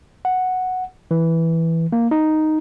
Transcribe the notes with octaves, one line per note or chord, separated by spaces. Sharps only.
F#5
E3
A#3
D#4